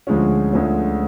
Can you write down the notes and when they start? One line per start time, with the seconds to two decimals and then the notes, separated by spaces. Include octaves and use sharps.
0.07 D2 D3 F3 G#3 C#4
0.53 D2 D3 F3 G#3 C#4